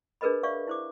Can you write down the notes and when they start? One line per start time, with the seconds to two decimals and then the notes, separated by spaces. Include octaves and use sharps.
0.21 D4 G#4 A#4 B4 D#5 B5
0.43 C#5 D5 E5 F5 C#6
0.68 E4 C5 D6